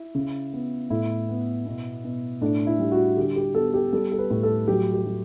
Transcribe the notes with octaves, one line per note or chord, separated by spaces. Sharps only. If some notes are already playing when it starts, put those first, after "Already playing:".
Already playing: E4
C#3
B3
A2 E4
B3
B2
B2
A2 D4
E4
G3
F#4
D3 G4
G4
B3 A4
G4
G3 A4
A4
B4
A2
A4
F#3 G4
G4
F#3